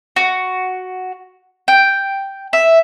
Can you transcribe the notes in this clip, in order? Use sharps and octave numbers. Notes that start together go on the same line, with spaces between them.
F#4
G5
E5